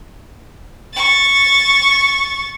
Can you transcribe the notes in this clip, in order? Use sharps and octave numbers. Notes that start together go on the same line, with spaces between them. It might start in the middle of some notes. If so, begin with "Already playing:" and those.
C#6 A6